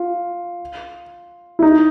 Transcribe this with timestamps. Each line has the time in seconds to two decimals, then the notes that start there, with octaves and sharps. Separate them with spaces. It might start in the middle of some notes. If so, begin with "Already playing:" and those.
Already playing: F4
1.59 E4
1.62 D#4